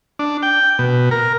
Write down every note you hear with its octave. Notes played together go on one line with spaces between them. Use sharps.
D4
G5
B2
A#4